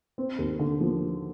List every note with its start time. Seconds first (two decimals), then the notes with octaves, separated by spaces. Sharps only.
0.18 C4
0.39 D#2
0.59 D3
0.81 F3